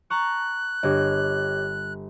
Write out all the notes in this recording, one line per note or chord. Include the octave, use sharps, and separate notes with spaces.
A5 A#5 C#6 F#6
G1 G4 C#5 D#5